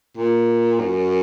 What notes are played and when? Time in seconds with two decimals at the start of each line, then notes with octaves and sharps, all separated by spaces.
0.17 A#2
0.79 F#2